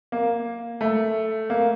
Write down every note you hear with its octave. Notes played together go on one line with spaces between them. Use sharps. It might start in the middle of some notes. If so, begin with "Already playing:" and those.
A#3
A3
A#3